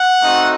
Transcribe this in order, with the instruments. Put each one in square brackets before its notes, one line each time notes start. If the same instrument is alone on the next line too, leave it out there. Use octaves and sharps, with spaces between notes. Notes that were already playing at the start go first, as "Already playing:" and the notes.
Already playing: [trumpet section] F#5
A3 C4 D#4 F#4